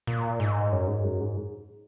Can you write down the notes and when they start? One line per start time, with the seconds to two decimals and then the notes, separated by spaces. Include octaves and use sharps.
0.07 A#2
0.40 G#2
0.72 F#2
0.87 G#2
1.04 F#2
1.20 G#2